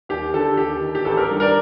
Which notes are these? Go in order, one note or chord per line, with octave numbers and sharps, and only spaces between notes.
D#2 G4
D3 A4
D#2 G4
D#3
G4
A1 A4
G4 A#4
G2 D#3
A#4 D5